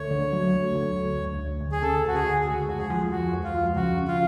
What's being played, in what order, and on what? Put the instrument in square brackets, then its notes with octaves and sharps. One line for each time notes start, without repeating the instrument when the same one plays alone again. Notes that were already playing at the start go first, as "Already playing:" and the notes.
Already playing: [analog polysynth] D2 A3 [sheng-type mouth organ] C#5
[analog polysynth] D3
F#3
D2
D2
D2
D2
D2
D2
[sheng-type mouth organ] G#4
[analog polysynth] C#3 [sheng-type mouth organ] A4
[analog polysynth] D2 [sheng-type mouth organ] F#4
[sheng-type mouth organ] G#4
[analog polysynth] D2
[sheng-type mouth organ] G#4
[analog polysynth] G#3 [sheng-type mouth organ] F#4
[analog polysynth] F2 [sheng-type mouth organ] F#4
[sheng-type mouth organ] G#4
[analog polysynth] F3
[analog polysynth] F3 [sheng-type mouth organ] F#4
[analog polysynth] F2
[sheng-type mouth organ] F4
[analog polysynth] F3
[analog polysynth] C#3 [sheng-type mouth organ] F#4
[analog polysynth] C#3
[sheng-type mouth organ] F4